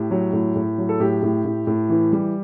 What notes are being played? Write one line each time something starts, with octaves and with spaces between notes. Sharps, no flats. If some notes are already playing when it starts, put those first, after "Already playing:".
Already playing: A2 G4
F#3
A2
A2
F#3
A4
A2 G4
A2
A2
A2
E3
G3